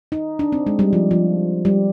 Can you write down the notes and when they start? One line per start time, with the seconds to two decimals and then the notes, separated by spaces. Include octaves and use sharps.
0.12 D#4
0.39 D4
0.52 C4
0.67 G#3
0.79 G3
0.93 F3
1.11 F3
1.65 G3